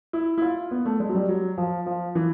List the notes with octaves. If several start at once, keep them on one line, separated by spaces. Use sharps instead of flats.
E4
E4
F4
B3
A3
G#3
F#3
G3
F#3
F3
F3
E3